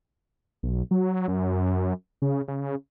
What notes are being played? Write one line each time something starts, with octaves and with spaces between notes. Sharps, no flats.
B1
F#3
F#2
C#3
C#3